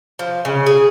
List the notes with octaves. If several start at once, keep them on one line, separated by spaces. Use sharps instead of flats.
F3
C#3
G#4